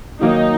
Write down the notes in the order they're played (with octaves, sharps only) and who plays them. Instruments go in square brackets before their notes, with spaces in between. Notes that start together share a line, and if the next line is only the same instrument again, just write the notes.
[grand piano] D#3 F#3 A#3 [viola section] D#4